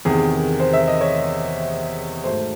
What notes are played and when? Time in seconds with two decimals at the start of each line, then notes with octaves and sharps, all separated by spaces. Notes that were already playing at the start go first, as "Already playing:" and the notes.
0.05 E2 C3 D#3 G#4
0.60 C5
0.73 E5
0.88 D#5
1.01 C#5
2.24 G#2 F#3 A3 C5